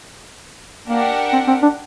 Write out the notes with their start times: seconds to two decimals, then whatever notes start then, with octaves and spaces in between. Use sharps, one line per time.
0.88 A#3 D4 G4 A#4 F#5
1.33 C4
1.48 C4
1.62 D4